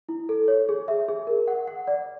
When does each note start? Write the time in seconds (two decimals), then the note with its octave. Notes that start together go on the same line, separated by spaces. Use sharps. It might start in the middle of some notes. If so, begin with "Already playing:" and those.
0.09 E4
0.29 A4
0.48 C#5
0.69 G#4
0.88 E5
1.08 G#4
1.27 A#4
1.48 F#5
1.68 F#5
1.88 D5